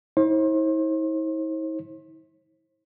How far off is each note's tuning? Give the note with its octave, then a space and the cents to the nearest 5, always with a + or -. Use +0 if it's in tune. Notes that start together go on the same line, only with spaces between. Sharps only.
E4 -45 C5 +40